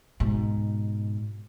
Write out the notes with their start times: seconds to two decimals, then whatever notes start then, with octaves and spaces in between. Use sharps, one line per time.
0.20 G#2 B2